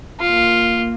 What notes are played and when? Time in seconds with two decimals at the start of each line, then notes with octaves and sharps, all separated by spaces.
0.20 A#3 F4